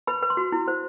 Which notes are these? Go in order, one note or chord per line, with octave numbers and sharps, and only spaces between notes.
B4 B5
B4
C6
F#4
E4
C5